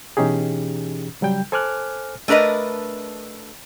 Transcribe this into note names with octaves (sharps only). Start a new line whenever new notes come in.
B2 E3 C#4 D#4 G4 G#4
C#3 F#3 G3 G5 G6
A4 C5 G#5 D6 F6 F#6
A3 D4 A#4 B4 D#5